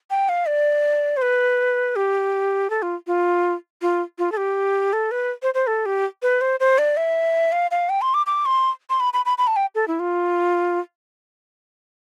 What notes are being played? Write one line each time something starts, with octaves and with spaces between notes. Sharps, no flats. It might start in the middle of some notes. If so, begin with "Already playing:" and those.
G5
F5
D5
C5
B4
G4
A4
F4
F4
F4
F4
A4
G4
A4
B4
C5
C5
A4
G4
B4
C5
C5
D5
E5
F5
F5
G5
C6
D6
D6
C6
C6
B5
B5
B5
B5
A5
G5
A4
E4
F4